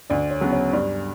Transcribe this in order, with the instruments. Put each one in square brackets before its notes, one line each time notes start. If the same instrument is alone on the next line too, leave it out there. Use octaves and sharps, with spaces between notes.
[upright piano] D2 [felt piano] D5
[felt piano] C#5
[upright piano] C#3 F#3 B3
[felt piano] C#5
[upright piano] G2 [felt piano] D5